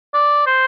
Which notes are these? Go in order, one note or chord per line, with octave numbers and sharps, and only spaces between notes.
D5
C5